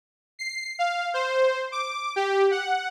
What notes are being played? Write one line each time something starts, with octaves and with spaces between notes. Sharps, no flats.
C7
F5
C5
D6
G4
F#5